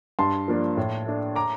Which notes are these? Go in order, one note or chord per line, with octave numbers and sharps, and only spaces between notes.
G2 A5 C6
F3 A#3 D4
A2
A3 D4
A#5 D6